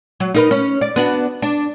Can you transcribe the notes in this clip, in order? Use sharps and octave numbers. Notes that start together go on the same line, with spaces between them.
F#3
D#4 A#4 B4
C#4
D5
B3 D4 F#4
D4